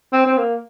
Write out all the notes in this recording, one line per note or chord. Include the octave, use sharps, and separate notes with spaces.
C4
C4
A#3